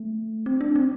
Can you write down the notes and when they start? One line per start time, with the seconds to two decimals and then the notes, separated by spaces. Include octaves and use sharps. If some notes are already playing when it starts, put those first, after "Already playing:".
Already playing: A3
0.46 C4
0.61 D4
0.76 C4